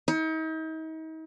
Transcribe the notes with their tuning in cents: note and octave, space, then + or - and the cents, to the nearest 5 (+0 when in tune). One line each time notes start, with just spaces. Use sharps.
D#4 +40